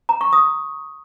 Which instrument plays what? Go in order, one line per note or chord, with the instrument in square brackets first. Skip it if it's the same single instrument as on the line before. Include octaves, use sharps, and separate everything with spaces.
[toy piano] A#5
C#6
D#6